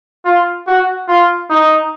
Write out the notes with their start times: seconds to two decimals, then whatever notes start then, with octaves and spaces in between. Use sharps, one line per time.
0.25 F4
0.67 F#4
1.08 F4
1.50 D#4